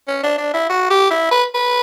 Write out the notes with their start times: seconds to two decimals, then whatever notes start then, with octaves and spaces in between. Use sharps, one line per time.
0.08 C#4
0.23 D4
0.38 D4
0.54 E4
0.69 F#4
0.90 G4
1.10 E4
1.31 B4
1.55 B4